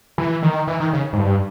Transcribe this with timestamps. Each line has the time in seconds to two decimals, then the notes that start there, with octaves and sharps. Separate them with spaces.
0.18 E3
0.43 D#3
0.68 E3
0.80 D#3
0.93 C#3
1.13 G#2
1.18 G2